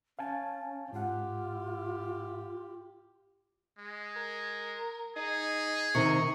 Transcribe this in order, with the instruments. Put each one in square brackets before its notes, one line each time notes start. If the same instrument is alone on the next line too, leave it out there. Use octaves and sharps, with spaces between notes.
[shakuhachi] C#4 [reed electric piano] F5 G#5 A5
[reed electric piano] G#2 F#5 [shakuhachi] F4 [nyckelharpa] G4
[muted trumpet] G#3
[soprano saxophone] A#4
[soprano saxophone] D#4 [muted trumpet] G#4
[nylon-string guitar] C3 D#3 [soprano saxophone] C#6